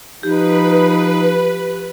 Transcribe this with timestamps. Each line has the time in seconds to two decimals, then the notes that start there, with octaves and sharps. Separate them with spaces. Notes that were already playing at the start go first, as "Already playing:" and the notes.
0.23 F3 D#4 G4 B4